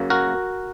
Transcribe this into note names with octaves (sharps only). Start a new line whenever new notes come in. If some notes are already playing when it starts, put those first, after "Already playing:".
Already playing: F#2 C#3 F#3 A#3
F#4 A#4